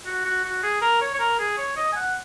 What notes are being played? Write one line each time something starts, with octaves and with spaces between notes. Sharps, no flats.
F#4
F#4
F#4
G#4
A#4
C#5
C#5
A#4
G#4
C#5
D#5
G#5
F#5